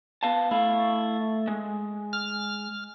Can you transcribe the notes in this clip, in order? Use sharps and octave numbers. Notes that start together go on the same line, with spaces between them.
B3 F5 A5
A3 E4 F5
G#3
F6